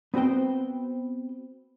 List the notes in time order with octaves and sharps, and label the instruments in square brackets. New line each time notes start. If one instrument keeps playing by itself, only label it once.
[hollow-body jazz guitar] B3 C4 F#4 C5 G5